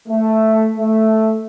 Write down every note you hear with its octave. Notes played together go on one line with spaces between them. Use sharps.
A3
A3